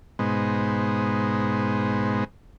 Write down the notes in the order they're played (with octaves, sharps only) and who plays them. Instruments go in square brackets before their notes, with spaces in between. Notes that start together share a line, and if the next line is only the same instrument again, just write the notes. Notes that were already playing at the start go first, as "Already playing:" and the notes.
[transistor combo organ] G#2 B2 G#3 B3 D#4 C5